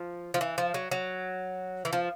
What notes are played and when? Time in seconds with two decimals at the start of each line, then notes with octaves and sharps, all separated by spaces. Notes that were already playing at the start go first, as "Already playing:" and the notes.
Already playing: F3
0.34 F3
0.41 E3
0.58 F3
0.74 F#3
0.91 F#3
1.85 E3
1.93 F3